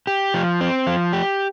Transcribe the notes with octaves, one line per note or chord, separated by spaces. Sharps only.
G4
F3
C4
F3
G4